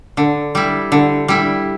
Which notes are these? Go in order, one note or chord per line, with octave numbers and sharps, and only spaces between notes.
D3
G3 E4
D3
G3 E4